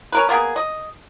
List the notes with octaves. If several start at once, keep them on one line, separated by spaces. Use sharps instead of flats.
C#4 A#4 B4
A#3 B3 G#4 A#4
D#5